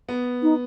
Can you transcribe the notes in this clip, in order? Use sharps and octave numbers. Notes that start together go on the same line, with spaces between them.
B3
D#4